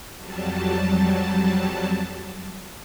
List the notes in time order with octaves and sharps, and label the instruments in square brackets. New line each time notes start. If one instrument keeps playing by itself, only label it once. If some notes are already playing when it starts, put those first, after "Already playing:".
[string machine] F2 F#3 G3 A5